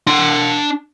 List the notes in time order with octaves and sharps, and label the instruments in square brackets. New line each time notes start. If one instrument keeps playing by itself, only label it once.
[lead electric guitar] D4 C6